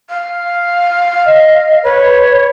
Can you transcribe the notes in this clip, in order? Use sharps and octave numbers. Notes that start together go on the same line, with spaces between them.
F5
D#5
B4 C#5